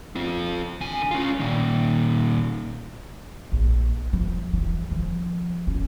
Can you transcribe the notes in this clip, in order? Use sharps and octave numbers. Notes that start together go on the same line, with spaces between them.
C4 F4
D3 G#5
C#4 F4
A#2 D#3
A#1
F3
E3
F3
C#4